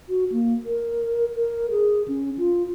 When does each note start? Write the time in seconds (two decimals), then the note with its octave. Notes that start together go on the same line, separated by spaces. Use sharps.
0.09 F#4
0.32 A#3
0.65 A#4
1.35 A#4
1.71 G#4
2.08 C#4
2.38 F4